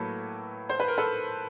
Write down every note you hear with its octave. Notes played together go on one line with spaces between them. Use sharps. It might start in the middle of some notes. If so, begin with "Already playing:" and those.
Already playing: A2 F#3 A#3 A4 B4
C5
B4
A#4
A4 B4